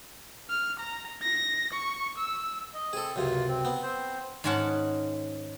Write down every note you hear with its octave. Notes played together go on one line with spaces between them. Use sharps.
F6
A#5
A#6
C#6
E6
D#5
C4 G#4 A4
C#2 F#2 C3 F4
C4
B3
C4 C5
G#2 D#3 G#3 C#4 F#5 A5